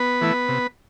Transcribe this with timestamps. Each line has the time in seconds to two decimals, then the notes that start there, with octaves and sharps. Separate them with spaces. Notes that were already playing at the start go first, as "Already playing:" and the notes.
Already playing: B3 B4
0.21 E3 A3 E4
0.48 C3